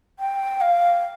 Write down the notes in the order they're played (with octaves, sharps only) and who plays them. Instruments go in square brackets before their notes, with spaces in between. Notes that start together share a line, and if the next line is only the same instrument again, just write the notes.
[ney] G5
F5